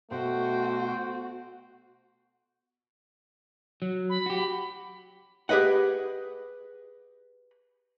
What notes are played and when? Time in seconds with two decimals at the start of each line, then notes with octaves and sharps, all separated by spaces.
0.11 B2 A3 F#4 C5 G5
3.82 F#3
4.10 B5
4.26 F#4 G4
5.49 G4 G#4 B4 D#5 F#5